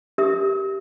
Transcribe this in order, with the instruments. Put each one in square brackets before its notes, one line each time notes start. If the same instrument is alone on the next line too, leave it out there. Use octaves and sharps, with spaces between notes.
[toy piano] G4 A#4 E5 D#6